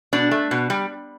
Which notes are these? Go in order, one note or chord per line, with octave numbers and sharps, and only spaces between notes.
B2 D4
A3
B2
G3